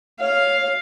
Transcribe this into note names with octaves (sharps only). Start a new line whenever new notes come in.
C#5 F5